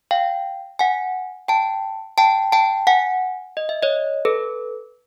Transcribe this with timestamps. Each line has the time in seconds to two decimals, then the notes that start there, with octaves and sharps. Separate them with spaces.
0.11 F5 G5
0.79 F#5 G#5
1.48 G5 A5
2.18 G5 A5
2.52 G5 A5
2.87 F#5 G#5
3.57 D#5
3.69 E5
3.83 C#5 D#5
4.25 A4 B4